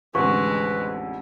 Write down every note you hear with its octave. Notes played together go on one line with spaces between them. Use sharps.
A1 F2 D3 G#3 B4 C#6